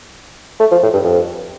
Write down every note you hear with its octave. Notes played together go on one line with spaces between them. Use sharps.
A3
F3
A2
G2
F2